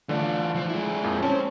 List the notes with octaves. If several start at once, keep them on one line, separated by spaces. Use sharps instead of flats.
D3 E3 A3 F4 D5
F3
G#3 E4
F2 A#2 F3
C4 C#4 C5 A5